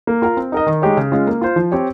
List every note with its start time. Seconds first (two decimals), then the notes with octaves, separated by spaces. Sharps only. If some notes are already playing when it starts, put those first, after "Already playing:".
0.07 A#3
0.22 F4 A#4 F5
0.37 C4
0.52 D#4 A#4 D#5
0.67 D#3
0.82 G#3 D#4 G4 C#5
0.97 C#3
1.12 G#3 C#4 F4
1.27 A#3
1.42 F4 C5
1.56 F3
1.72 C4 G4 C#5